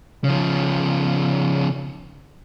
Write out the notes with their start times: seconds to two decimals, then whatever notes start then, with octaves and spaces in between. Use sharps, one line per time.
0.24 C#3 F3